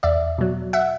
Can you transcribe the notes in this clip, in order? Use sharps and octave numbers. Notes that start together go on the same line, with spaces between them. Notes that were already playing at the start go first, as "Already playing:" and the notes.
E2 D5 E5
B2 F#3
E5 F#5